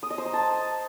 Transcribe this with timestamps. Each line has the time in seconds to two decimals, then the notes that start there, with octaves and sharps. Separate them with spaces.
0.03 D#6
0.10 D#5
0.18 C5
0.26 A#5
0.33 A5